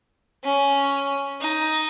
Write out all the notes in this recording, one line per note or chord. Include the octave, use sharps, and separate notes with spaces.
C#4
D#4